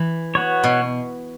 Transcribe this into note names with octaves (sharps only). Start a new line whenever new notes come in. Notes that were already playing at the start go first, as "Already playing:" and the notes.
Already playing: E3
B3 F#4 C#5
B2